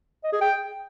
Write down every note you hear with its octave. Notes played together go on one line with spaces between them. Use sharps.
D#5
G#4
G5